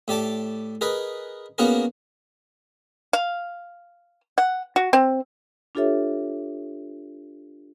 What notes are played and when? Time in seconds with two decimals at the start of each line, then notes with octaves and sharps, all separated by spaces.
0.08 A2 G4 D5 A5 D6
0.81 G#4 A#4 B4 D#5
1.58 A#3 B3 C#4 F#4 G#4 A#4
3.13 F5
4.38 F#5
4.76 F#4
4.93 C4
5.75 D4 F4 G4 A4 C#5 E5